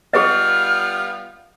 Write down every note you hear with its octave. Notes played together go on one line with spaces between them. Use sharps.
G3 B3 F4 G#4 B4 D#5 F6